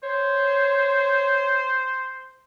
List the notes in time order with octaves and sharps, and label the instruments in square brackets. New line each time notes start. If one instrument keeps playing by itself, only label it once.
[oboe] C5 [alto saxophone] C#5